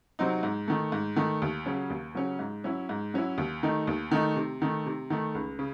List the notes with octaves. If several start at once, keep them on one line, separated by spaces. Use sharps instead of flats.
C3 F#3 C4 D#4
G#2
D#3 A3
G#2
D#3 A3
D#2
C#3 F#3 C#4
D#2
C#3 F#3 C#4
G#2
F#3 C#4 E4
G#2
F#3 C#4 E4
D#2
D#3 A3 D#4
D#2
D#3 A3 D#4
C3
D#3 A3
C3
D#3 A3
C#2
C#3